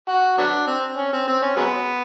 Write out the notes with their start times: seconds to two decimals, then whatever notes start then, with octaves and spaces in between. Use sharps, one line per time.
0.09 F#4
0.38 F#3 B3 D4
0.67 C4
0.97 C#4
1.13 C4
1.28 C4
1.42 C#4
1.57 F#3 G#3 B3